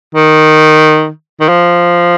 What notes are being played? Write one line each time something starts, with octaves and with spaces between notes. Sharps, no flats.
D#3
D#3
F3